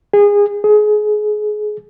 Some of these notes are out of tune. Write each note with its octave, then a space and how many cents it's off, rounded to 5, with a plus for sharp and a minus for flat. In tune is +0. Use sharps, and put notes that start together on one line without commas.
G#4 -25
G#4 +25